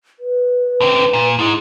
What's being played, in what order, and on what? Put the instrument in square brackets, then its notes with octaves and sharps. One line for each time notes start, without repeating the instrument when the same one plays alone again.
[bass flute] B4
[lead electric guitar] D3 C4
A#2
[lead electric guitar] G#2 G#3 [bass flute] E4